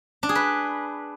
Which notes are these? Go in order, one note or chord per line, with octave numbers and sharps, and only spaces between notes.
D4
G#4
B4